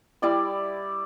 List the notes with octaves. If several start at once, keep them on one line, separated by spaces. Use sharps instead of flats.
G3 E4 D5 D#6